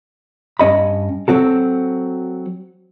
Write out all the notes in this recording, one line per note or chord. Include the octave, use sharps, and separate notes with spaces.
G2 C#4 D#5 B5
F#3 C4 F#4 A4